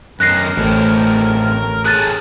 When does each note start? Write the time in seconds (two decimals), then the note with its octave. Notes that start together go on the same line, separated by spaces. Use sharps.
0.20 F#2 D#3 A#4 F#6 A#6 C7
0.57 A1 A2 C4
1.85 G#4 A4 C#5 F#6 A6 D#7